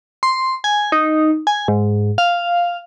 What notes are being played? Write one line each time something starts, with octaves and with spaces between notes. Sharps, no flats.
C6
G#5
D#4
G#5
G#2
F5